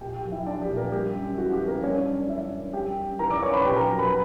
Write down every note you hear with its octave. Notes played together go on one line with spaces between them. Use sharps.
A#2 G4 G5
G4 G5
F#3
E4 E5
F#3 D4 D5
G4
A#2
A#3 A#4
G3 G4
F#2
E3 F#4
G4
F#2
A#3 A#4
G3 C#4 C#5
F#2 D4 D5
E3 E4 E5
F#2
G3 G4 G5
F#2
E3 A#4 A#5
D5 D6
F#2 C#5 C#6
B4 B5
A#2 G4 G5
A#4 A#5
F#3
B4 B5